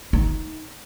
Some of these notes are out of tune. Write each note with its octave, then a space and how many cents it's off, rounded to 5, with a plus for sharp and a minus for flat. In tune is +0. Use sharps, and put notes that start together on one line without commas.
D#4 +15